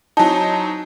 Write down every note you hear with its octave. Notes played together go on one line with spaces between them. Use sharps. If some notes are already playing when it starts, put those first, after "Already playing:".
F#3 C4 D#4 E4 G#5 A5